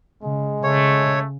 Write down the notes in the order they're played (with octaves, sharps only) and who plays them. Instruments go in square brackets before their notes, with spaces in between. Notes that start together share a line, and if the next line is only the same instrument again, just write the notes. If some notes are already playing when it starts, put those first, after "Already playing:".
[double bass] C#3 [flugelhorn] G#3
[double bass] C#3 [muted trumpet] A3 [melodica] C#5